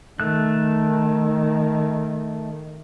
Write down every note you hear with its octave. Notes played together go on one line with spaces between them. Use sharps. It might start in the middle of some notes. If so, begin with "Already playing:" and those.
D#3 A3 F#6